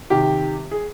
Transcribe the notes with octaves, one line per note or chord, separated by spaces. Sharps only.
C3 D#3 G4
G#4